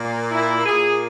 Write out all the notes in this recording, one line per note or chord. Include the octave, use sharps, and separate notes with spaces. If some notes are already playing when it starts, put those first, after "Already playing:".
Already playing: A#2
E4
A#2 G#4